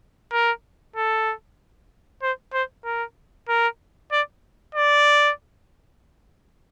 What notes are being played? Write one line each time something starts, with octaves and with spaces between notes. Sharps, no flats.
A#4
A4
C5
C5
A#4
A#4
D5
D5